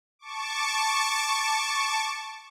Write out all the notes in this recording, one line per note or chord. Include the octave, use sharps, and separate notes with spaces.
A5 C#6 D6